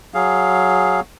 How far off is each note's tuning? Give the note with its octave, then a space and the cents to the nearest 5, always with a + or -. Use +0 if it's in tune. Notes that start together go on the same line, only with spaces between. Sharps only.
F#3 +0 G#4 +5 F5 +0